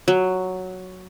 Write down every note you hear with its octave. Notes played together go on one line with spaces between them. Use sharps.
F#3